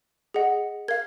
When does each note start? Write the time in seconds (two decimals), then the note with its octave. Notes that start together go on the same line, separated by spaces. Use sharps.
0.34 G#4 D#5 F#5
0.88 A#4 F5 G#6